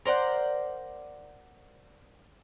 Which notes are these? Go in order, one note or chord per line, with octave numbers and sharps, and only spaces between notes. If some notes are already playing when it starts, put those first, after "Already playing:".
A#4 C5 D5 F#5